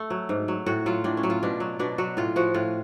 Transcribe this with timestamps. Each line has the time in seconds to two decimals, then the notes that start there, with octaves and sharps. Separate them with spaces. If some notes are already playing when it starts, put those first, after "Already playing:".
Already playing: A3
0.10 F#3
0.29 G#2
0.48 F#3
0.66 A2 F#4
0.86 F#3 F4
1.04 A2 D4
1.17 C#4
1.23 F#3
1.30 F4
1.43 B2 D4
1.60 F#3
1.79 B2 D4
1.98 F#3 F#4
2.17 A2 F4
2.36 F3 F#4
2.54 A2 F4